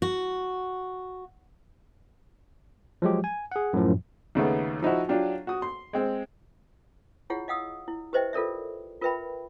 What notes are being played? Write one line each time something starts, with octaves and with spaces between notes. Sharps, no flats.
F#4
F3 F#3 G#3 G4
G#5
G#4 F#5
F#2 A2 F3
D#2 C#3 A3 B3
F3 D#4 E4 F#4
F#3 D4 F4 G4
F#4 D#6
C6
G#3 C4
E4 F4 G#4 C#5 F#5
D#5 F5 F#5 D#6 E6
E4
G4 B4 C5 D#5 E5 G5
F4 A4 A#4 D5 E5
F4 A#4 B4 E5 G5 B5